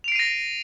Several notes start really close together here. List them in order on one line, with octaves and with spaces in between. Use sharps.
F7 D7 C7 D#7 A#6